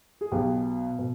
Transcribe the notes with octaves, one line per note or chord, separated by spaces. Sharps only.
G#4
B1 B2 G4
B2